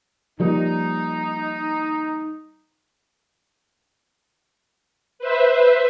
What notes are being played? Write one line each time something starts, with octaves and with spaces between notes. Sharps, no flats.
F3 G3 A#3 D#4
B4 C5 E5